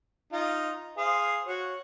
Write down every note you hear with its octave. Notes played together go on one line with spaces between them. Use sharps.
D#4 F4
G#4 C5 F5
F#4 C#5